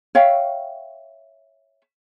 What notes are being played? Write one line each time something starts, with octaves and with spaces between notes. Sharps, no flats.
C#5 E5 F5 G5